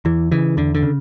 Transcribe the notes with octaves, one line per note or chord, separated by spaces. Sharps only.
E2 E3
C#3 E3
E2 D3
D3
C#3